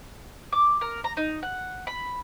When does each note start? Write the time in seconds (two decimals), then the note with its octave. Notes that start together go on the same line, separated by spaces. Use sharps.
0.52 D6
0.81 A#4
1.04 A#5
1.17 D#4
1.43 F#5
1.87 B5